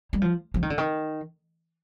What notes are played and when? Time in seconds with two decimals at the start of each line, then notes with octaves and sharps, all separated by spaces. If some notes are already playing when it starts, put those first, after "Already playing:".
0.13 G3
0.21 F3
0.54 F3
0.62 D#3
0.70 D3
0.78 D#3